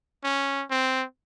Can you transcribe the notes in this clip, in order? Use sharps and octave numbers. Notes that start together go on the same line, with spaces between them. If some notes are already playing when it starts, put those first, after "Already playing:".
C#4
C4